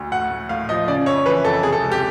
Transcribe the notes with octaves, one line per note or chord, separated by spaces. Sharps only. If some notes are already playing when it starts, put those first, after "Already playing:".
Already playing: D2
A2 F#5
A2
A2 F5
F3 D#5
C#3 D5
F2 C#5
E3 B4
F2 A4
C3 G#4
A4
C#2
G4